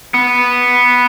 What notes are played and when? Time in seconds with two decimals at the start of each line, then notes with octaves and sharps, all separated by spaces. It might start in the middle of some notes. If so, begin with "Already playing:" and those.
0.14 B3